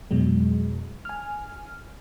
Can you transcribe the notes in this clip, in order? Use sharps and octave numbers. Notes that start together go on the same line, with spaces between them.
F2 B2 F#3 G#3
G#5 F6